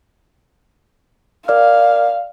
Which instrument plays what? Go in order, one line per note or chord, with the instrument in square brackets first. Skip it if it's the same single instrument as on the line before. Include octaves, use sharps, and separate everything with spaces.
[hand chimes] A#4 D5 F6 [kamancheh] F5